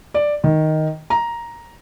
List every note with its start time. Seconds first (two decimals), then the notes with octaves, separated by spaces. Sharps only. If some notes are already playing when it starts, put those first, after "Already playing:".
0.14 D5
0.44 D#3
1.10 A#5